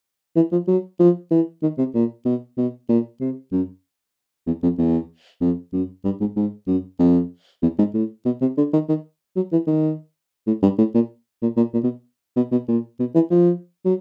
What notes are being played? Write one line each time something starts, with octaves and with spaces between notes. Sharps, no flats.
E3
F3
F#3
F3
E3
D#3
C3
A#2
B2
B2
A#2
C3
F#2
E2
F2
E2
F2
F#2
G2
G#2
G#2
F#2
F2
E2
G#2
A2
B2
C3
D3
D#3
D#3
F#3
E3
D#3
A2
G2
A2
A#2
A#2
A#2
A#2
B2
B2
B2
A#2
B2
E3
F3
F#3